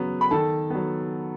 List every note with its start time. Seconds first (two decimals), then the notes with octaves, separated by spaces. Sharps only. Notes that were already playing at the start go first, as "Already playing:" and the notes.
Already playing: C#3 F#3 B3
0.21 B5
0.31 D#3 A4 A5
0.70 F#3 B3